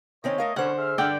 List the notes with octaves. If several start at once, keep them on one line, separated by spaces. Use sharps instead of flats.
D#3 C4 C#4 C#5 D#5
A3 A#4 F5
C2 B2 D3 C#4 C5 F#5
G#4 E5 F6
G2 D3 D5 F#5 G5